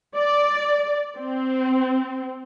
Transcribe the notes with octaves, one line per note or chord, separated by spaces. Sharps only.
D5
C4